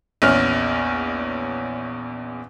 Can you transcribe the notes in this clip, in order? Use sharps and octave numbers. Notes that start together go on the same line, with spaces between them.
A#1 E2 C#4 F6